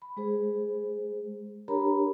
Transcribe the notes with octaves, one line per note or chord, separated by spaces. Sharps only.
B5
G#3 G#4 C5
D4 G4 A#4 C#5 A#5 B5